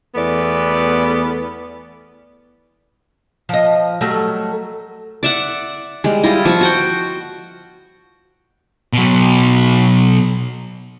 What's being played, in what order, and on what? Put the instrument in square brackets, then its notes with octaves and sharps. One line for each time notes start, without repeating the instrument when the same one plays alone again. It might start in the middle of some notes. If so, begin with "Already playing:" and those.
[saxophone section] E2 A3 B3 D5
[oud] F3 D#5
F#3 G3 A3
[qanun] D5 E5 F#5
G3 G#3
G3 E4 F4 D#5
F3 C#6
F#4 F#5 G5
[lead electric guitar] B2 F#3